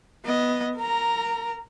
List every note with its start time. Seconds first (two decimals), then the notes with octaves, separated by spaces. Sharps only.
0.25 B3 D#5
0.76 A#4 A#5